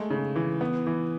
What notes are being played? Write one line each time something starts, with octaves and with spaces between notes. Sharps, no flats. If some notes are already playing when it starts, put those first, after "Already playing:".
Already playing: G#3 A3
C#3
E3
B3
E3